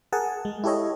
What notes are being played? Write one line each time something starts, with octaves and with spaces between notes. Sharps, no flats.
G#4 A#4 F#5 G#5 A5
G#3
E4 G4 A4 C#5 D#5